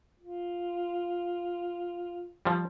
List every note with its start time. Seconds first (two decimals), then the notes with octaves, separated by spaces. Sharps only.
0.20 F4
2.45 F3 G3